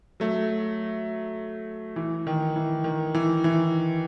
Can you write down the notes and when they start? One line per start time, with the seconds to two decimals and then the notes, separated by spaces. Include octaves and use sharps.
0.20 F#3 A3
1.96 E3
2.27 D#3
2.56 E3
2.84 D#3
3.15 E3
3.44 E3